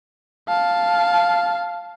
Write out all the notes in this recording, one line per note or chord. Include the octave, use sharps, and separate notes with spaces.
F5 A5